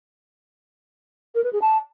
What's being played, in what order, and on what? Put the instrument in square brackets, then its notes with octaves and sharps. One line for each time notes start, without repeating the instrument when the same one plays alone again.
[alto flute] A#4
B4
G#4
A5